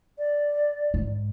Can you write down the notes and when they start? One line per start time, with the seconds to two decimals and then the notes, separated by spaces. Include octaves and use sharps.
0.18 D5
0.94 G#2